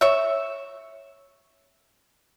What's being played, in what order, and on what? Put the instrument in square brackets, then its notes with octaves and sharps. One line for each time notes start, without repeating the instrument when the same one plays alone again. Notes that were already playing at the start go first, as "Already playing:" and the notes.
[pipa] C#5 E5